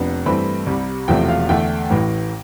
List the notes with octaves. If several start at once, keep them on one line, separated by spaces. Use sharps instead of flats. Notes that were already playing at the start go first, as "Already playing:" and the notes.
Already playing: F1 F2 B3 D4
G2 E3 A3 C4 B5
C2 C3 G3
E1 E2 C3 F3 A3 G5
F5
E2 D3 A3 D4 G5
A1 A2 E3